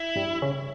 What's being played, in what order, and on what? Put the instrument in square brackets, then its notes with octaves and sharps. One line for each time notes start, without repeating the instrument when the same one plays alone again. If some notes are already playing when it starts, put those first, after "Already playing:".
Already playing: [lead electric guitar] E4
[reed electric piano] G2 G3
C#3 C#4